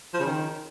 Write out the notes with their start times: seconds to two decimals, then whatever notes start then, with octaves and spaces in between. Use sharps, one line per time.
0.13 F3
0.20 C#3
0.26 D#3